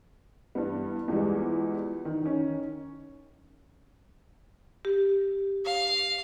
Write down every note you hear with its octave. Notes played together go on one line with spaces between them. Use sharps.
G2 E3 G3 B3
E2 E3 F3 G3 G#3
D#3
D#3 C#4
G4
F5